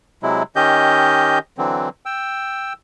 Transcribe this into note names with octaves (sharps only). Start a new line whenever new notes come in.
C3 F#3 G#3 E4
D#3 C#4 G4 D#5 G6
D3 E3 F#3 C4
G5 E6